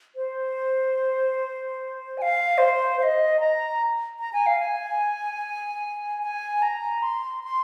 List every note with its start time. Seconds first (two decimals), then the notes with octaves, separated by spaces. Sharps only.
0.16 C5
2.18 G#5
2.22 F5
2.58 C5
3.00 F5
3.03 D#5
3.40 A#5
4.20 A#5
4.33 G#5
4.46 F5
4.59 G#5
6.22 G#5
6.62 A#5
7.03 C6
7.43 C6